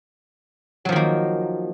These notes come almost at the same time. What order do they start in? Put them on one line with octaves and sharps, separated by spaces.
F#3 F3 D#3 A#3